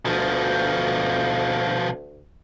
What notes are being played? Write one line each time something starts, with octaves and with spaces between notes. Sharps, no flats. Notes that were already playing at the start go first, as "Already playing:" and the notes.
D2 B2 F3